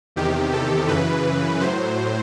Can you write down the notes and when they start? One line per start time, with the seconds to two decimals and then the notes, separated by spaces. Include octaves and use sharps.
0.16 E2 C3 D#3 G4
0.53 A4
0.88 F#2 C#3 E3 B4
1.61 A2 F#3 C5